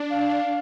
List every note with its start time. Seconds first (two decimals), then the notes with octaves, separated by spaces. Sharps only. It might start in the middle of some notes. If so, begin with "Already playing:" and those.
Already playing: D4
0.10 F5